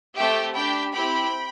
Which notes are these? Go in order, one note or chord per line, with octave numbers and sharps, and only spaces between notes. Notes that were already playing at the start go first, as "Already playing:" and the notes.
A3 C4 G4 E5 G5
D4 G4 G5 B5
C4 E4 G4 G5 B5